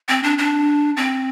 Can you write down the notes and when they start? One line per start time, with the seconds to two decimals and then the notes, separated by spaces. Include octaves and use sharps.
0.09 C4
0.23 D4
0.38 D4
0.97 C4